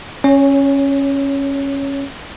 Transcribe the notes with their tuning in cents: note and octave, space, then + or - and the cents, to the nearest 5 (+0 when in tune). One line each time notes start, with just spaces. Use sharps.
C#4 -10 C#5 +15